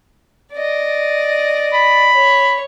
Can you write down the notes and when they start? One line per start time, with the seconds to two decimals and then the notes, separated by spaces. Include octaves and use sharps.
0.53 D5 D#5
1.73 B5
2.14 C#5